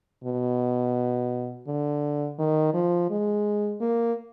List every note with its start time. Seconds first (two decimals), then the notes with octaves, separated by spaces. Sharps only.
0.24 B2
1.67 D3
2.39 D#3
2.74 F3
3.10 G#3
3.81 A#3